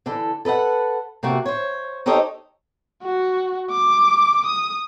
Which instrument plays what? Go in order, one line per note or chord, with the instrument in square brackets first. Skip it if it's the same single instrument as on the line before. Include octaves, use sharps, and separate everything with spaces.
[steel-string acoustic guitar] D3 E3 A4
A4 B4 D#5 F#5
C3 A3 A#3 F#4
C5 C#5
D#4 G4 A4 C5 C#5 D#5
[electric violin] F#4
D6
D#6